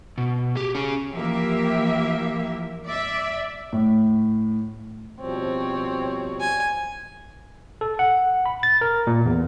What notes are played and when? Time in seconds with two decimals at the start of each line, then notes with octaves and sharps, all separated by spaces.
0.18 B2
0.55 G4 G#4
0.75 C#4 G#4
1.13 E3 F3 A#3 G4 E5
2.87 D5 E5
3.73 A2
5.20 B2 F3 G3 C4 C#5
6.41 G#5
7.81 A4
7.99 F#5
8.46 B5
8.63 A6
8.81 A#4
9.07 A#2
9.26 E2